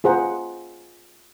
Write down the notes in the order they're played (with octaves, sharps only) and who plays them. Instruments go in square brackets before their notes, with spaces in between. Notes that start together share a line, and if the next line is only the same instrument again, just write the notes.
[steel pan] F4 G#4 C5 F#5 A#5